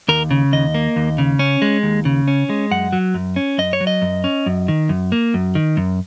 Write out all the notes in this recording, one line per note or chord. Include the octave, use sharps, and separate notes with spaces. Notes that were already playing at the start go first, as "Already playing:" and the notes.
D#2 A#4
C#3
D#2 D#5
A#3
D#2
C#3
C#4
G#3
D#2
C#3
C#4
G#3
F#2 F#5
F#3
F#2
C#4
F#2 D#5
C#5
F#3
D#5
F#2
C#4
F#2
D#3
F#2
A#3
F#2
D#3
F#2